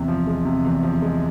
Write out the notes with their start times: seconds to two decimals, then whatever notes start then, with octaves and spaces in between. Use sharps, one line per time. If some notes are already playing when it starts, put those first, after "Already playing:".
Already playing: E2 C3
0.08 F3
0.27 G#3
0.45 C3
0.64 E2
0.83 F3
1.02 G#3